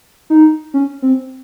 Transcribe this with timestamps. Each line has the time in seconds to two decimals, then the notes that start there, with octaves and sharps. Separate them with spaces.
0.30 D#4
0.74 C#4
1.02 C4